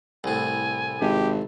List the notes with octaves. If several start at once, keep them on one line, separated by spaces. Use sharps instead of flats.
C2 A2 G#5
G#1 G4